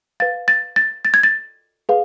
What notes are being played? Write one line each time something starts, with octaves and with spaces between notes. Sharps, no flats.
B4 F5 A6
A6
A6
A6
G#6
A6
G#4 B4 F5